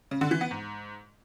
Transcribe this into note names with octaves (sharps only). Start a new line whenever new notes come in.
C#3
D3
E3
B3
G#2